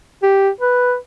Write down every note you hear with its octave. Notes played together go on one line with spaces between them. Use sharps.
G4
B4